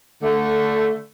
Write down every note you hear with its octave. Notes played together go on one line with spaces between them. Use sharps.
D3 A3